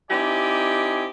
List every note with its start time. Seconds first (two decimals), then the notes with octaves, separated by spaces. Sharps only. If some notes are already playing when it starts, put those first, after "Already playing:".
0.10 C4 D#4 E4 G4 D5 G#5